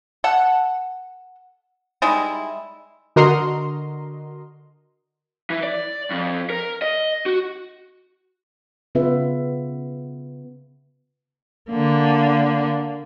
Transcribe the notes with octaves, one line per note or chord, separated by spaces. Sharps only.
A4 F#5
G3 G#3 D#4 E4
D3 F#4 A#4 D#5 A#5 C6
E3
D5
F2
A#4
D#5
F#4
C#3 B3 F4 B4 E5
D3 A#3